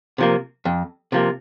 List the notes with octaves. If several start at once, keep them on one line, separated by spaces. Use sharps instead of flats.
C3 F3 A#3
F2
C3 F3 A#3